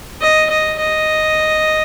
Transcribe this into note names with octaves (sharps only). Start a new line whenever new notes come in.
D#5
D#5
D#5